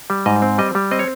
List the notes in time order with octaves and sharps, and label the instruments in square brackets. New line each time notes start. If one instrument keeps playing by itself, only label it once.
[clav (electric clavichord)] G3
G#2 D#5
C4
G3 D#5
G3
C4 D#5
C#5